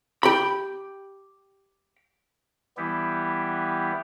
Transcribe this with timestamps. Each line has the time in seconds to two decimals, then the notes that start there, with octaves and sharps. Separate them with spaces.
0.23 G4 B5
2.77 E3 G3 B3 E4 G4